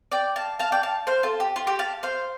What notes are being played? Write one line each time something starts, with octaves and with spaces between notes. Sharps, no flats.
D5 G5
F5 A5
F5 A5
D5 G5
F5 A5
C5 F5
F4 A4
G4
F4
G4
F5 A5
C5 F5